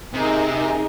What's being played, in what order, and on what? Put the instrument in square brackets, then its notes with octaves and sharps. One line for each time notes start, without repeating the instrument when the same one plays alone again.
[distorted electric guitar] C3 [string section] D#4 G#4 A#4